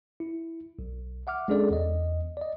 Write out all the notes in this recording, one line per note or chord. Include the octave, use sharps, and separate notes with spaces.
E4
B1
E5 F#5 D6 F6
G#3 C#4 D4 G#4 A4 D5
E2 D#5
D5 D#5